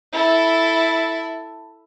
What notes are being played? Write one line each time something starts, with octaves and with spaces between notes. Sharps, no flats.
E4 A4